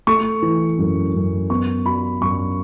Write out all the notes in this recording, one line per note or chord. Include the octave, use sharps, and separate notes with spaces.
A3 C#6
E3
F#2
F#2
B3 C#6
F#3 B5
F#2 C#6